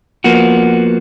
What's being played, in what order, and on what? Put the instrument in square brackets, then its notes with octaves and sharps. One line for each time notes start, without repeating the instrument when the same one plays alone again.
[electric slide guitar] F3 A#3 B3 F#4